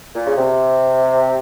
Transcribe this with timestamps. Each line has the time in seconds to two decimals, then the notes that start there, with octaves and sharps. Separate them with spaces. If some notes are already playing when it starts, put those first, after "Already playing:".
0.15 A#2
0.27 C#3
0.37 C3